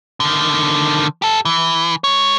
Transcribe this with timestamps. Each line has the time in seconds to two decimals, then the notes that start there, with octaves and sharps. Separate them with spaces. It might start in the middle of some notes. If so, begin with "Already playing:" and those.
0.20 D3 D#3
1.22 G4 A4
1.45 E3
2.04 G#3 C#5